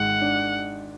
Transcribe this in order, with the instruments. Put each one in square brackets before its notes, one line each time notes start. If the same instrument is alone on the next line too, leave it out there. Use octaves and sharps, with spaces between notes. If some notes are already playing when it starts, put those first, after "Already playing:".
Already playing: [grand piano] G#1 G#2 [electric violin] F#5
[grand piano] D4